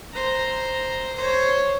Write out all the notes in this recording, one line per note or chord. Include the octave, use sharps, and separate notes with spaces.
C5 A#5
C5 C#5